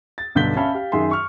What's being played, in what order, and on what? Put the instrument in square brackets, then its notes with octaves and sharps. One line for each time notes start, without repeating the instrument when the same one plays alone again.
[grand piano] A6
B1 G2 D3 G6 B6 G7
C#4 E5 F5 A5 B5
G4 F5
F#2 D#3 G#4 E5 C6
C#6 F6